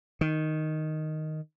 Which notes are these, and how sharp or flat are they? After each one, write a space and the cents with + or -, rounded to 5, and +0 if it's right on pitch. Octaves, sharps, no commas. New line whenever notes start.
D#3 +0